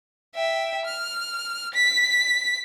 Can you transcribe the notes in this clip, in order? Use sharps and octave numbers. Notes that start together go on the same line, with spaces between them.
E5 G5
F6
B6